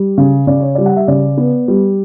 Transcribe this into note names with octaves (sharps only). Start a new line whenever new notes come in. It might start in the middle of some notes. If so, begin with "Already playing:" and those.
Already playing: G3
C#3
C#3 D5
C#5
G3 D5
F#5
E5
C#3 D5
B3
G3